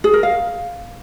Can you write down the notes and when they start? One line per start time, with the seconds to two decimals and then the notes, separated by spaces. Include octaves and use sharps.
0.04 G#4
0.14 A#4
0.23 F5